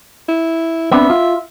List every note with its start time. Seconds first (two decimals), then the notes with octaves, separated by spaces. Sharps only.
0.28 E4
0.91 B3 C4 D4 E5
1.10 F4